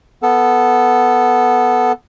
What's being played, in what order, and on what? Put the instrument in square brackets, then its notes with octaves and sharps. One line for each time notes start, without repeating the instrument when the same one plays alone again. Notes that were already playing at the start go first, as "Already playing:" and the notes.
[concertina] B3 A4